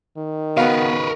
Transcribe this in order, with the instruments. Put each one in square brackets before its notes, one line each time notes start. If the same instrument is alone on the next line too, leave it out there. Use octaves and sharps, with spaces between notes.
[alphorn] D#3
[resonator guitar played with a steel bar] C#3 F#4 F5 [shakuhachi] B3 [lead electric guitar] A#4 B4